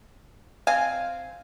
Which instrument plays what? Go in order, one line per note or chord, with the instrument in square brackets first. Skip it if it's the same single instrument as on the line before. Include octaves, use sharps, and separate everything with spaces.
[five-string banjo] C4 F5 G#5